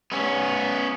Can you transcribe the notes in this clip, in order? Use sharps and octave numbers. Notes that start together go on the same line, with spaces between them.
B3 C#4